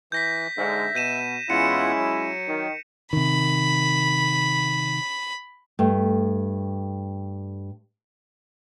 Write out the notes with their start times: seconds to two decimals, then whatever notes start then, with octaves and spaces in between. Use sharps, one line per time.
0.12 E3 G6 A#6 B6
0.58 G#2 D3 E5
0.95 B2 G6 D#7 E7
1.50 E2 G#3 C#4 E4 F4 F#5 C#7
1.97 F#3
2.47 D#3
3.13 C3 D#3 B5
5.79 G2 A3